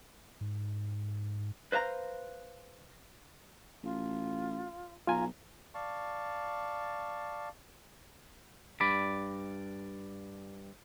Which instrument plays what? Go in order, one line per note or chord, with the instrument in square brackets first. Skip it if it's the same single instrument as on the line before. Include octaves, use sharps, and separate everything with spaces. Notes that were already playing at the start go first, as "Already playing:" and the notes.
[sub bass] G#2
[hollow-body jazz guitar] B4 C5 F5 A#5
[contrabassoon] A1 [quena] F4
[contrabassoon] B1 [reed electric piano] F4 G#5 [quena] A#5
[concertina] D5 F5 A5 C#6
[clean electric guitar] G2 D5 B5